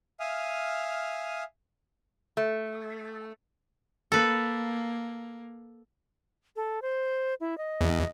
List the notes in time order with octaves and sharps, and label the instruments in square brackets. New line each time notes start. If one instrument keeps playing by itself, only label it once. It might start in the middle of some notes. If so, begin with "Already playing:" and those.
[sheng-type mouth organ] E5 F5 G#5 D#6 F6
[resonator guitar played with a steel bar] A3
[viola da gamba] A#3 [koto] A4 B4
[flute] A4
C5
E4
D#5
[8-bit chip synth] E2